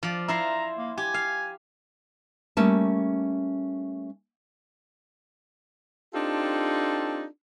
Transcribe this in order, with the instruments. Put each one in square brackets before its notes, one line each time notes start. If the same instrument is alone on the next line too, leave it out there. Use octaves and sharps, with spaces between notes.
[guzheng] F3 D5
[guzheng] E4 F4 C5 [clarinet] A#5
[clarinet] A#3
[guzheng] G4 [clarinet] G#5
[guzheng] F5
[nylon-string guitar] G3 A3 A#3 C#4 A5
[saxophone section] C4 D4 D#4 F4 G4 A4